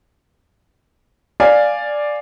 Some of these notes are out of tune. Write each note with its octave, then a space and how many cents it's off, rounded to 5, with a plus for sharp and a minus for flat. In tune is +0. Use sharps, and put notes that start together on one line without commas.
D5 +0 F5 +0 G#5 +0